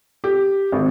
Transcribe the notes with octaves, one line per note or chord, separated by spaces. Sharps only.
G4
G#1